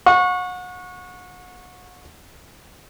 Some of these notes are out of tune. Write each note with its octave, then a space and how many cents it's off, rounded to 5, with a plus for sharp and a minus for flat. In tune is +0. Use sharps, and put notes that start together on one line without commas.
F#5 -35 C#6 -10